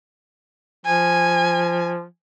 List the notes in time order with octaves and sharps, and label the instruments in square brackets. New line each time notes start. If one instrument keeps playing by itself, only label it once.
[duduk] F3 [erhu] G#5